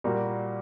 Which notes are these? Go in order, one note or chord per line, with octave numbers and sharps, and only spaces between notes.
A#2 G3 A#3 F#4